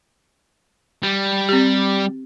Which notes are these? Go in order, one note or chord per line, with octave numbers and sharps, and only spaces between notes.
G3
C4 G4